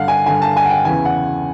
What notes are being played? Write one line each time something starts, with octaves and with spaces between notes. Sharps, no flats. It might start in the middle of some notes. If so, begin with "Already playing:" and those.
Already playing: G2 D3 F5 F#5
G#5
G2 D3 G#5
A5
G#5
F#5
G5
E2 C#3 E3 G#5
F#5